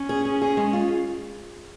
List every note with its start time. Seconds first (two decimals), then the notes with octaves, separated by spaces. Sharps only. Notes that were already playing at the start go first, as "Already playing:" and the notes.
Already playing: C#4
0.09 G#4
0.25 G#4
0.42 G#4
0.57 G#3
0.73 F4